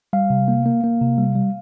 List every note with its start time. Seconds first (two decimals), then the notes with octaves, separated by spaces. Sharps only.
0.13 G3 F5
0.30 C3
0.48 A#3
0.66 A#3
0.84 A#3
1.01 C3
1.18 G3
1.36 G3